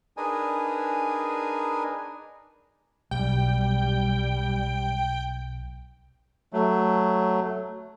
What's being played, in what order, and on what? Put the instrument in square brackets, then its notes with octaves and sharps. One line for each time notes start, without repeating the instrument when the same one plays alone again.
[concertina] D4 D#4 G#4 A#4 B4 G#5
[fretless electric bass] B1 [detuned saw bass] G3 [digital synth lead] G5
[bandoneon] F#3 A3